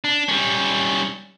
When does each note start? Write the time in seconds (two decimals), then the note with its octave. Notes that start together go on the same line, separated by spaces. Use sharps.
0.04 D4
0.29 G3 C#4